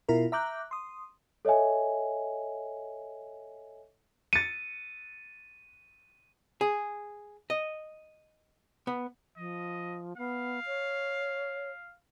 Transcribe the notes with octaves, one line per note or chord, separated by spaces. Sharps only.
B2 E4 F4 A#4
E5 A#5 D6 F#6 G6
C6 D#6
A4 C#5 D#5 E5 G#5
A6 C#7 D#7
G#4
D#5
B3
F3 D#5
B3 F5
C#5